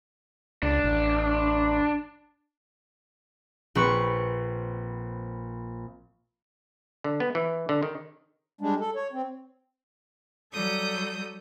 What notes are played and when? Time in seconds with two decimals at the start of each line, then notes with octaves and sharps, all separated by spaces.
0.63 C#2 D4
0.84 A1
3.75 A#1 C4 B4 C#6
7.04 D3
7.20 B3
7.35 E3
7.69 D3
7.83 D#3
8.61 G3 G#3 D4
8.80 A4
8.96 C#5
9.13 C4
10.52 F#3 G3 A4 D#6 G6